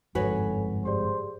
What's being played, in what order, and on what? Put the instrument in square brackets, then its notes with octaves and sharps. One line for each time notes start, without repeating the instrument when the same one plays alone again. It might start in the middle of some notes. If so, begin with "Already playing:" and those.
[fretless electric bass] G1 F2 G#2 [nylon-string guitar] F#4 B4 C#5 [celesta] A4 G#5
[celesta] G4 G#4 D5 [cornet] C5